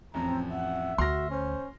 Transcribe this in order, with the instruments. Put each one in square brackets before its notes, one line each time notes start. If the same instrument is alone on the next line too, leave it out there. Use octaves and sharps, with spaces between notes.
[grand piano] A1 F2 [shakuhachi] C4 [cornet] A#5
[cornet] E5 [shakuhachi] F#5
[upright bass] D2 [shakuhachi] F#4 [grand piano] C6 F6 A#6
[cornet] C#4 [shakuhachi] C5